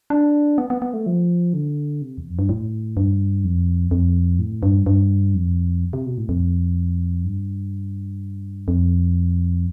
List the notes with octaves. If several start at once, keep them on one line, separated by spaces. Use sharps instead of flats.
D4
B3
B3
B3
A3
F3
D3
C3
E2
F2
G2
A2
G2
F2
F2
A2
G2
G2
F2
C3
B2
A2
F2
G2
F2